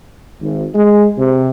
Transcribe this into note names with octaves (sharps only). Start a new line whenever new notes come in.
G#1
G#3
C3